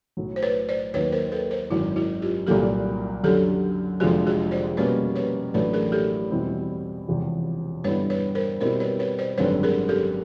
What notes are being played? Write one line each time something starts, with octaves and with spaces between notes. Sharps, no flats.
B1 A2 F#3
C5
B4 C#5
C5 D5
D#2 D#3 F#3 A#3 B4 C#5
A#4 C5
A4 B4
A#4 C5
G#1 F#2 D#3 E4 F#4
E4 F#4
F4 G4
C2 A#2 F#3 A#3 G4 A4
F#2 D3 F#3 G4 A4
F1 F2 D3 F3 G#3 F#4 G#4
F#4 G#4
C5 D5
B2 G3 A#3 C#4 B4 C#5
B4 C#5
A1 A2 F#3 A3 D4 A4 B4
G#4 A#4
G4 A4
E2 B2 G3 C4 E4
E1 E2 C3 F3
G2 D3 G3 B3 E4 B4 C#5
B4 C#5
A#4 C5
B2 G3 C4 E4 A#4 C5
B4 C#5
B4 C#5
C5 D5
G#1 F#2 D3 G3 C4 B4 C#5
G#4 A#4
G4 A4